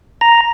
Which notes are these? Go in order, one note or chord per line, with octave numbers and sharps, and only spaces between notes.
A#5